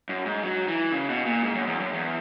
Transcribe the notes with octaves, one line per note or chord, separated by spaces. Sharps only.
F#2
G#2
F#3
E3
C#3
B2
A#2
G#2
F#2
E2
F#2
E2